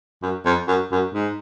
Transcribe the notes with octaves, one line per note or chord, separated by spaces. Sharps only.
F#2
F2
F#2
F#2
G#2